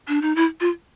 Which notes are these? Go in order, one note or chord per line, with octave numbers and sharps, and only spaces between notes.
D4
D#4
E4
F4